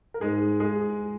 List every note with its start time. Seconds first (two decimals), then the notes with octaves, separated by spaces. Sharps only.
0.14 A#4
0.21 G#2 G#3 G#4
0.60 G#3 G#4